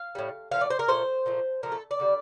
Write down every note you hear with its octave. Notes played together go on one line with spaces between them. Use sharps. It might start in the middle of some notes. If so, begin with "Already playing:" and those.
Already playing: F5
A2 G3
A#2 F3 A3 F5
D5
C5
A#4
A#2 F3 A3 C5
A#2 F3 A3
A#2 F3 A3 A#4
A4
D5
D3 G3